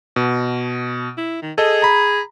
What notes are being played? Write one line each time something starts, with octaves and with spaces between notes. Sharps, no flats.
B2
E4
D#3
G#4 A4 D#5
A#5 B5